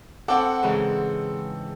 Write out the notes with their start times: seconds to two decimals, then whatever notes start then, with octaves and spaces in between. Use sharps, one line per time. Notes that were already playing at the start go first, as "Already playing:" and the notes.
0.28 C4 A4 F#5 D6
0.63 G#2 C#3 E3